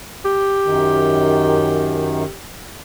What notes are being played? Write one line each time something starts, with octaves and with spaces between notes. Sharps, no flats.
G4
F#2 D#3